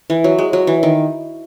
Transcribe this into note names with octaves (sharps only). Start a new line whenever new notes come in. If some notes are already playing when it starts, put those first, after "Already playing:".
E3
F#3
G#3
F#3
E3
D#3